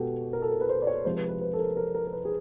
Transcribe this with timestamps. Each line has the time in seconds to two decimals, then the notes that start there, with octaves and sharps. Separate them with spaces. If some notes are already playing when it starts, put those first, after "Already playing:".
Already playing: B2 G#3 B3 F#4 G4 A4
0.33 A#4
0.42 A4
0.51 A#4
0.61 B4
0.69 C5
0.82 D5
0.87 C#5
1.05 C3 F3 G#3 C5
1.17 B4
1.29 B4
1.41 B4
1.53 A4
1.59 A#4
1.77 A#4
1.95 A#4
2.07 A#4
2.13 B4
2.25 G#4